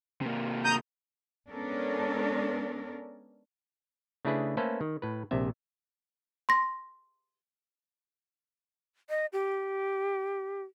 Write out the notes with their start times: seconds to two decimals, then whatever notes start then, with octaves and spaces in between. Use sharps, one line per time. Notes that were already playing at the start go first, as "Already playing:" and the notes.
0.21 C3 A#3
0.65 A#5 D#6 G6
1.48 G#3 B3 C#4 D4 A4 A#4
4.25 C#3 A3 D4 E4 G#4 B4
4.57 A3 A#3 C#4 A4 B4 C5
4.81 D#3
5.02 A2 B4
5.31 A#1 C3 E5
6.49 C6 A#6
9.10 D#5
9.33 G4